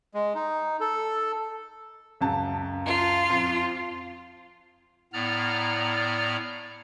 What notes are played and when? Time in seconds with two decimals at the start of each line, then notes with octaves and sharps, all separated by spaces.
0.14 G#3
0.35 D#4
0.81 A4
2.21 C#2 F#2 A5
2.86 F4
3.30 F2
5.13 A2 B3 D5 A#5 F6